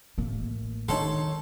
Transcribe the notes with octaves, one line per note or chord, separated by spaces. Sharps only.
A1 A#3
D#3 D#4 A4 C#5 A5 C6